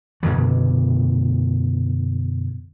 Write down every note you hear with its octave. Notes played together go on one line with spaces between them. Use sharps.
F#2 B2 D3 F#3